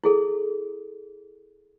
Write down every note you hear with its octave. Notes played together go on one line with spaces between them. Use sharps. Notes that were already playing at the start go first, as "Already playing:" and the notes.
E4 G#4 A4